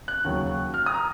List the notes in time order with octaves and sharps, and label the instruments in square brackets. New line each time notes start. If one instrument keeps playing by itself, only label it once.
[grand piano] F#6
D#2 C#3 F#3
F6
D#6
A#5